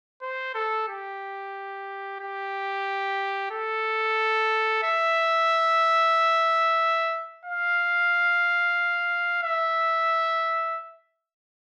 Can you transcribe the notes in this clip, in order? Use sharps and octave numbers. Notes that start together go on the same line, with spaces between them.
C5
A4
G4
G4
A4
E5
F5
E5